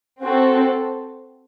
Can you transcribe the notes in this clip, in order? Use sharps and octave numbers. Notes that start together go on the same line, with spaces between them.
C4 F#4 A4